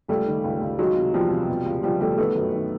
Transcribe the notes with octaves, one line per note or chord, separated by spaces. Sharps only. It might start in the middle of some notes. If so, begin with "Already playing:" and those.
C#2 G3 A3
D#3
C#2
C#2
D#3 F#3 G#3
C3
E2 F3 G3
C3
B2
C#2
C#2 F3 G3
B2 G3 A3
D#3 A3 B3
F#2
D#3